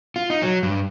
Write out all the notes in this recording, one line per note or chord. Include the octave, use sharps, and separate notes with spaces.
F4
D#4
F#3
G2